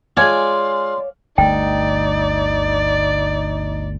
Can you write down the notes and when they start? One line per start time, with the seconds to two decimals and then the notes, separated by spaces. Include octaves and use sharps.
0.17 G#3 F4 C#5 D5 F5 G#5 C6
1.38 G1 D2 A3 D#4 D5 G5